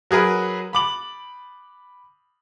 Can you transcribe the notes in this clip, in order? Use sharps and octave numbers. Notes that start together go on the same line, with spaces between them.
F#3 G#4 A#4 B4
B5 D6 F#7